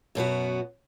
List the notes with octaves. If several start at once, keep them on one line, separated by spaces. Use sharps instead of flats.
F#2 B2 B3 F#4